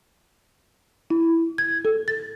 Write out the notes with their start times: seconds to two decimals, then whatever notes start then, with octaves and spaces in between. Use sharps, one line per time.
1.10 E4
1.58 G#6
1.85 A4
2.08 A6